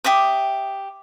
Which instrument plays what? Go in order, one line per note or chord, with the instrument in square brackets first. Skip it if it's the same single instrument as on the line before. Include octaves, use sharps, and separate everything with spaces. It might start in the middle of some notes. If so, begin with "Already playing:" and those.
[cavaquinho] G4 E5 D6 D#6